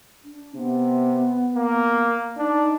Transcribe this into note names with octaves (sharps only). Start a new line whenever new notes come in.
D4
C3 B3
A#3
D4 D#4